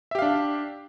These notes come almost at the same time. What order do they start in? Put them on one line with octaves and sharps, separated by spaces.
E5 G4 F5 D4